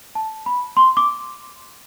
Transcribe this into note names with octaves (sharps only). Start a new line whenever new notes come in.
A5
B5
C6
D6